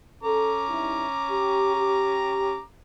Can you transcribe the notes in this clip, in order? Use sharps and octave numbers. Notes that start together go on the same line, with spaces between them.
C#4 A4 A#5 D6
G2 D#4 E4
G4
G4